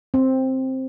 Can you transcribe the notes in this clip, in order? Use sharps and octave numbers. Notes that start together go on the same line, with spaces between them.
C4